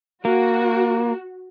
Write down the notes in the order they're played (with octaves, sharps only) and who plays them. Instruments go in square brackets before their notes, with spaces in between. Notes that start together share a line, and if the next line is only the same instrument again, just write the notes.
[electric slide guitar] A#3 [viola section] F#4